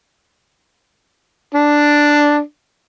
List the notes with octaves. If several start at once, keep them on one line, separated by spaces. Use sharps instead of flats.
D4